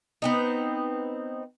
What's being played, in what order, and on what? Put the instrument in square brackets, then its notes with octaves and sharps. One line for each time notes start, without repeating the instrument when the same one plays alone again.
[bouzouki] B3 C4 D#4